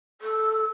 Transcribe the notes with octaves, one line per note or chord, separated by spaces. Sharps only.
A4